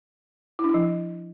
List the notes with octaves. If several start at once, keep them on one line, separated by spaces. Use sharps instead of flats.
E4
D4
E4
F3